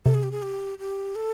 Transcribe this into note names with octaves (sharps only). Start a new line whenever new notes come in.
C3 A4
G#4
G4
G#4
G4
G4
A4